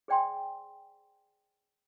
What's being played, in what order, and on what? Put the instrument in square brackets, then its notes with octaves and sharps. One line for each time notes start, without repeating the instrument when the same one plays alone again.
[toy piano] G#4 C5 D5 G5 G#5 C6